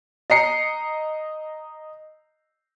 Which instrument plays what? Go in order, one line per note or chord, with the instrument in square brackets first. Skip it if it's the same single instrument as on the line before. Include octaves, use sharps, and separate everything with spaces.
[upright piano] D#5 A#5 C7 C#7